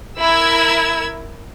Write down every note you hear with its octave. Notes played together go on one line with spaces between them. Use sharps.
E4 A#4 E6 G#6